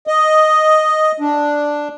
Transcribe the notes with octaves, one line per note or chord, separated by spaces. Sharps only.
D#5
D4